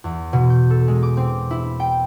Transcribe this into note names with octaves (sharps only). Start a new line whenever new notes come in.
E2
B2
G6
A4
G#3
D6
C4
E4
G5